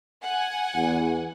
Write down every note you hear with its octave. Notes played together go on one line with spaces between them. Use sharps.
F#5 G#5
E2